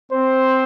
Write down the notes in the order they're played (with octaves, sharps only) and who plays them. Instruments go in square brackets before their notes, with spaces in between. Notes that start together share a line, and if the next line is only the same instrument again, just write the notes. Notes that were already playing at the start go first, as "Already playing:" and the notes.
[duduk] C4 [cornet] C5